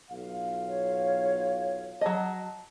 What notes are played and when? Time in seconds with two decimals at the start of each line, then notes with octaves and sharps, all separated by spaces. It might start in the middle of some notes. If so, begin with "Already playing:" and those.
0.11 B1 F4 F5
0.68 C#5
2.01 F#3 D#5 A5